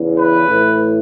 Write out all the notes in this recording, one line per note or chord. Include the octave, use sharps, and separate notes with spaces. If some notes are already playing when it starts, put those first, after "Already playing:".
Already playing: E2 C#3 E3
B4
A2 E3